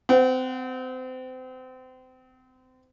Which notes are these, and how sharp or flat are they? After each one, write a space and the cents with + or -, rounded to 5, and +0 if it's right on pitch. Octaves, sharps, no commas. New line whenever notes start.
C4 -30 F#5 +0